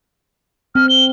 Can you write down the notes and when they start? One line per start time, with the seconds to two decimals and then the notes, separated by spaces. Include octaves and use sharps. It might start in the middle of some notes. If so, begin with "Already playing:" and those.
0.75 C4 F6
0.89 G7